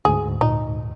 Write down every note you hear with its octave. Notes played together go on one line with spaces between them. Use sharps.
D2 G#2 G#4
A#2 D#4